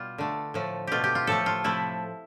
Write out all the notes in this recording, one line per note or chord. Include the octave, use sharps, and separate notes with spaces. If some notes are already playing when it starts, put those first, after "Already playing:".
Already playing: B2 G3 F4
D3 A3
A2 F3 A3
B2 A3 F4 G4
G4
F4
A2 F3 A3 A4
F4
C3 F3 A3 E4